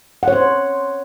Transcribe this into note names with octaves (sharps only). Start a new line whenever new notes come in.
C5 C#5 F#5